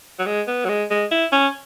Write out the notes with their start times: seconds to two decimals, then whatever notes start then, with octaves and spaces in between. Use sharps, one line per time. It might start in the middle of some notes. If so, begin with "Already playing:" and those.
0.19 F#3
0.26 G#3
0.47 B3
0.65 F#3
0.69 G#3
0.90 G#3
1.11 E4
1.32 C#4